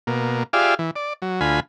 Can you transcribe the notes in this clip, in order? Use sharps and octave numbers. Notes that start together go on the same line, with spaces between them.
B2 A#3
F4 G4 G#4 D5 E5 F5
E3
D5
F#3
D2 F4 G#5 B5